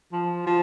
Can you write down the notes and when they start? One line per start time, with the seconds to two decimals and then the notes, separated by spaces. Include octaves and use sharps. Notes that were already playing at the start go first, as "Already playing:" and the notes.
0.12 F3
0.47 F3